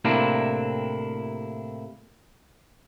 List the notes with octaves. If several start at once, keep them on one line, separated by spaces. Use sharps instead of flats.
A2 C3 A#3 C4 D4 E4